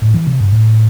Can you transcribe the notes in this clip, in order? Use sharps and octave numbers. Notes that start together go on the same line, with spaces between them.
A2
E3
C3
G2
A2